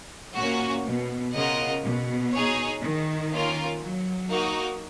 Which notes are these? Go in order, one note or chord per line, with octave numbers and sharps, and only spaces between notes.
A#2 A#3 C#4 F#4
B2
C#3 F4 A#4 D#5 F#5
B2
D#4 G#4 C#5
D#3
A#3 C#4 F4 A#4
F#3
A#3 D#4 F#4 A#4